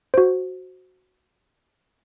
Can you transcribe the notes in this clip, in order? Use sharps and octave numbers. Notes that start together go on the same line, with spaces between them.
F#4 C5